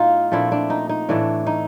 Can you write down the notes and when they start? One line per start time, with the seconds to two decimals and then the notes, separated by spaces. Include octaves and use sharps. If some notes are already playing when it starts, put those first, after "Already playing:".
Already playing: A2 F#3 B3 D#4 F4
0.31 A#2 F3 A3 C4 D4 E4
0.52 D4
0.70 D#4
0.89 D#4
1.09 A2 E3 A3 D4
1.47 D#4